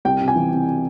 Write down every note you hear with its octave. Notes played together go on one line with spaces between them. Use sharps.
C2 G5
C3
G#5
E3
C3